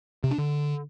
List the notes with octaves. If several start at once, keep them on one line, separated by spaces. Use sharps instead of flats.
C3
D4
D3